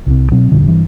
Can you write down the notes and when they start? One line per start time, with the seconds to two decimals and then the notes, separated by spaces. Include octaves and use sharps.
0.07 C2 C3
0.31 B2 F#3 C4
0.52 E1 A#1 G2 D3
0.67 G2 E3